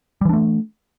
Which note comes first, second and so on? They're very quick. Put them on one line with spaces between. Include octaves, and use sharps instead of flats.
G3 E3 D4 A3